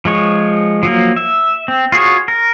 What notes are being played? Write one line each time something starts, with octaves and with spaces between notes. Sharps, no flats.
F3 G#3 C#5
F3 F#3 A#3
E5
C4
F4 F#4 G#4 C#5
A#4